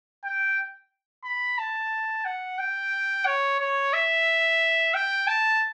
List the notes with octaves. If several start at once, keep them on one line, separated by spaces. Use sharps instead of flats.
G5
B5
A5
F#5
G5
C#5
C#5
E5
G5
A5